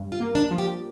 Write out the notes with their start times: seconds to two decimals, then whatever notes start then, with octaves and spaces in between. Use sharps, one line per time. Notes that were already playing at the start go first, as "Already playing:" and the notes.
Already playing: G2
0.12 F4
0.20 A#3
0.35 D4
0.51 F3
0.58 G4